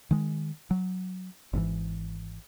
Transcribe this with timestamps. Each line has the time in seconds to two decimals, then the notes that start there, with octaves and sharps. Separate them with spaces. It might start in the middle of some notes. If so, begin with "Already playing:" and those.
0.11 D#3 G#3
0.71 F#3
1.53 G#1 G#2 D3 E3